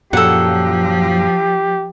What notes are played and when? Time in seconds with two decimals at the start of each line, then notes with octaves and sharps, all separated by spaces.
0.13 F#2 A#2 F3 F#3 G4 A4 F#5